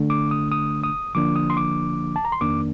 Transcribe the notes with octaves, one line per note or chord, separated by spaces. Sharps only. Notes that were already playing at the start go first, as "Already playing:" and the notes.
Already playing: D3 A3 D4
D6
D#6
D#6
D#6
D3 F3 A#3 D4 D6
D#6
C6
D6
A5
A#5
C6
F2 D#3 A#3 D4 D6